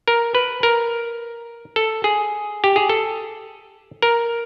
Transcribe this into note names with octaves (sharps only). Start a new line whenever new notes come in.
A#4
B4
A#4
A4
G#4
G4
G#4
A4
A#4